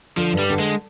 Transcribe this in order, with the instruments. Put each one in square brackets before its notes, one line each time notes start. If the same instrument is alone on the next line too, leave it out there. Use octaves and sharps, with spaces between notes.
[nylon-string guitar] D3 [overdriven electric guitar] F3
[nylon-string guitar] G2
[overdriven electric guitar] G3
[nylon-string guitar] D3
[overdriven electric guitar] G#3